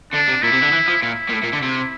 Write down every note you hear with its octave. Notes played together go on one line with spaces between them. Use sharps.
D3 D4
C3
A#2 E4
C3
D3
E3
F3
A#2 E4
A#2
A2
A#2
D3
C3